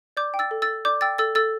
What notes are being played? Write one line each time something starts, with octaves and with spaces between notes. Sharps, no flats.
D5 D6 G6
G5
E6 A6
A4
E6 A6
A4
D5 D6 G6
G5 E6 A6
A4 E6 A6
A4 E6 A6